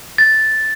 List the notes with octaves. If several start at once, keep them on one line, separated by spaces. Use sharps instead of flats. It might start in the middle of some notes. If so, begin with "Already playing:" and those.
A6